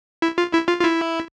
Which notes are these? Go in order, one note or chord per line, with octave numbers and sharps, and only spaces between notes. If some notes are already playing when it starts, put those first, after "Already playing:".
E4
F4
E4
F4
F4
E4